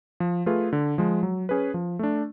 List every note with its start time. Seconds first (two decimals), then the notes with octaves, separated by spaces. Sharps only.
0.20 F3
0.46 A3 F4 G#4 B4
0.73 D3
0.98 F3 G#3
1.23 F#3
1.49 C#4 G#4 B4
1.74 F3
1.99 A3 D4